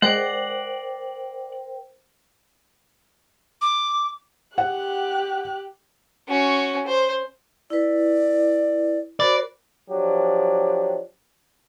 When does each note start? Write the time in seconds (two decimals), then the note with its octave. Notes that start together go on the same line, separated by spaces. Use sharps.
0.02 G#3 A#4 C5 D5 F#5 G5
3.61 D6
4.58 G4 F#5 F#6
6.28 C#4 F#4
6.87 C5
7.70 E4 B4 D5
9.20 F#4 A#4 C5 D5 B5
9.90 F3 F#3 D4 G4